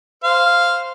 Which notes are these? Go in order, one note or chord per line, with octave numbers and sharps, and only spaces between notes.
C5 F5 F6